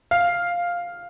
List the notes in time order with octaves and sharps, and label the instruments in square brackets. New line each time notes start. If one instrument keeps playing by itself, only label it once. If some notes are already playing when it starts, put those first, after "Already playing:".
[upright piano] F5